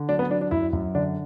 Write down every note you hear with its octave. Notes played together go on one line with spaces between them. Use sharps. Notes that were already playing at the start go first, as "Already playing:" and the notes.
Already playing: D3
F#3 D4
B3
F#3 D4
D4
F#2 E4
F#2
D3 D4